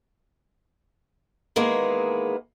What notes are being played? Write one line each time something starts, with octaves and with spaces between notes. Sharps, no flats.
D#3 E3 G#3 A#3 B3 G#4